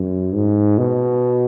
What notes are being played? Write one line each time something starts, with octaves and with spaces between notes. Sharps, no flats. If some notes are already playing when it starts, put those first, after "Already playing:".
Already playing: F#2
G#2
B2